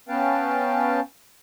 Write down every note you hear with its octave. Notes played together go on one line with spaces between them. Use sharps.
B3 C#4 B4 F5 G5 A5